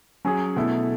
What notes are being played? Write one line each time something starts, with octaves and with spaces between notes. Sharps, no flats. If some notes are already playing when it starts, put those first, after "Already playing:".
F#3 C#4 G#4
B2 A3 E4 A4